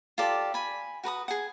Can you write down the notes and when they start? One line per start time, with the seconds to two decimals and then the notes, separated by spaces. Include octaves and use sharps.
0.18 F4 G4 A4 D5
0.54 G#5 B5
1.03 F#4 B4 A#5 D#6
1.28 G#4 F#5